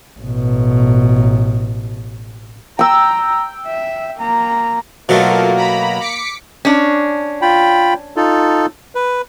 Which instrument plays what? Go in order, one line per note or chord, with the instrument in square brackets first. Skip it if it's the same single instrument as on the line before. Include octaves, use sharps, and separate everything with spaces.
[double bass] A1 B2
[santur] G5 E6 [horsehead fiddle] A#5
[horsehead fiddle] E5
A#3 A#5
[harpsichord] B2 F#3 A3 [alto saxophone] A#3 [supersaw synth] F4 A4 A#4
[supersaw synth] A#5 B5
D6 B6 C#7
[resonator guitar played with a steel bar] C#4 D4
[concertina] F4 G5 B5
D#4 F4 A4
B4